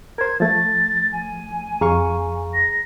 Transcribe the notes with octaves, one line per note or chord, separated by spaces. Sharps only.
A#4 C5 G#6
F3 A3 A6
G#5
F2 G#4 F5 A#5 C#6
A#6